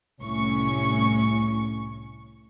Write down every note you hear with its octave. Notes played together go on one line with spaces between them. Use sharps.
C2 A2 C#4 C#6